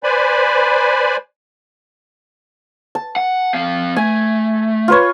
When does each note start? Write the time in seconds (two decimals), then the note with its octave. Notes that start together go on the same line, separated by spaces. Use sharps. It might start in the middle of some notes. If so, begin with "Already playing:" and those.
0.03 B4 C5 D5 G#5 B5
2.95 A5
3.16 F#5
3.54 C4 F5
3.96 A3 G#5
4.88 F4 B4 C#5